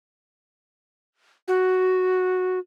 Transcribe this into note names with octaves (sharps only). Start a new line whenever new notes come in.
F#4